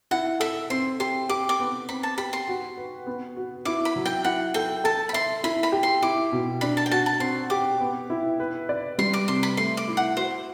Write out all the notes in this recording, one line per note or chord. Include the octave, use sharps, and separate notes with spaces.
E4 F#5
A4 E5
C4 C6
G4 C6
G4 D6
D6
B3
C4 B5
A5
G4 B5
C6
F#4
B4
B3
F#4
E4 D6
B5
F#3
G5
E4 F#5
A4 G5
A4 A5
B5
E5 C6
E4 B5
B5
G4
C6
E4 D6
B2
D4 B5
A5
G5
F#4 A5
A5
C4 C6
G4 D6
B3
E4
B4
D5
G3 C6
D6
C3 C6
B5
A3 C6
D6
E4
F#5
F#4 C5